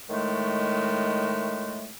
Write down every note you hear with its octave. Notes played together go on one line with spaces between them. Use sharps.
A2 D#3 G#3 A3